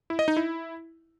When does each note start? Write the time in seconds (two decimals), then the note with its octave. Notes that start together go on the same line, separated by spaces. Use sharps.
0.10 E4
0.19 D#5
0.28 D#4
0.37 E4